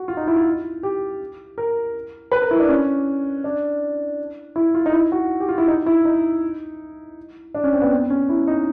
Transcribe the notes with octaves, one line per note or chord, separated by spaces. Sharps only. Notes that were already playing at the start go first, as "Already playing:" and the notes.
Already playing: F#4
F4
D#4
E4
F4
G4
A#4
B4
A#4
E4
D4
C#4
D4
E4
F4
D#4
E4
F#4
G4
F4
E4
D#4
E4
D#4
D4
C#4
C4
B3
C4
C#4
E4
D#4